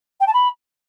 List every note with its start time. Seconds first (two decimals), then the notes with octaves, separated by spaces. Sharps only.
0.20 G5
0.27 A5
0.33 B5